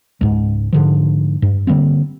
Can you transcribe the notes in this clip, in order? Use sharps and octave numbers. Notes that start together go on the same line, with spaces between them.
C#2 G#2
G#2 D3 F3
G2
D3 G3 A#3 C4